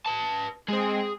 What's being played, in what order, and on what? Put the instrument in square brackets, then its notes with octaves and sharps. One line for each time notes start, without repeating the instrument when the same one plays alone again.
[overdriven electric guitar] B4 A5
[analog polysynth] G#3 C4 [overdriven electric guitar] G#4